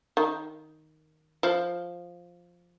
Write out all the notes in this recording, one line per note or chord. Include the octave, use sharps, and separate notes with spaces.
D#3
F3